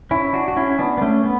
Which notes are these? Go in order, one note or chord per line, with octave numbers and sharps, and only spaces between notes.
C#4 E4
D4 F#4
F#4
C#4 E4
B3 D4
B3
A3 C#4
B3